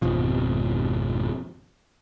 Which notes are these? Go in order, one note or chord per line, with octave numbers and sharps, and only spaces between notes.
G#1 F2 B2 F3